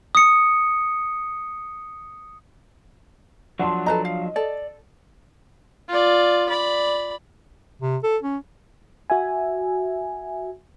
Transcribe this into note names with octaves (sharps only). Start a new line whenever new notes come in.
D#6 C#7
F3 F#3 D4 F#5 A5 C6
A4 B4 D#5 A#5
F5
A4 D5
F4 D5
D5 B5
C3
A4
C#4
F#4 E5 G#5